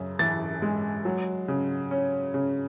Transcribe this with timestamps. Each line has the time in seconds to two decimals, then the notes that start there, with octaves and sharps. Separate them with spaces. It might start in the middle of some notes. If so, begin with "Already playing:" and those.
Already playing: F#2 C#3
0.19 E3 A6
0.62 G#3
1.05 F#3
1.48 C#3
1.91 C#4
2.34 C#3